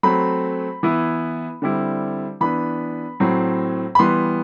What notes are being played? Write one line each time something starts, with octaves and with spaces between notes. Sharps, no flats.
F#3 A3 C4 B5
E3 B3 E4
D3 G3 C4 E4
E3 B3 D4 B5
A2 F#3 C4
B5
E3 G3 B3 C6